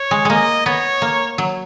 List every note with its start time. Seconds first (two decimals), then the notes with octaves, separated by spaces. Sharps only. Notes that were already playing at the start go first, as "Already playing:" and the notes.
Already playing: C#5
0.11 G#3
0.25 G#3 A#3 D#5
0.66 B3 C#5
1.02 A#3
1.38 F#3